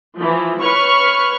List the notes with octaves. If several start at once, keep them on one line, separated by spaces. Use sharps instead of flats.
E3 F3
B4 C#5 C#6 F6